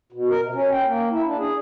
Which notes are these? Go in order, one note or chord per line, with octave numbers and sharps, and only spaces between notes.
B2
A#4
C3
C#4
G5
A#3
E4
D4
G#4